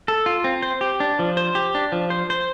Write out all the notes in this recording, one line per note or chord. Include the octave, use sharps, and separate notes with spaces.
A4
F4
C4
C5
G4
D4
F3
C5
G4
D4
F3
C5
C5